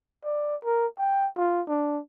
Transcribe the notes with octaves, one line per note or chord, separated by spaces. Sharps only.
D5
A#4
G5
F4
D4